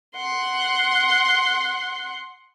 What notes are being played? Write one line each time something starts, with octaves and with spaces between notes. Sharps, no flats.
F#5 C6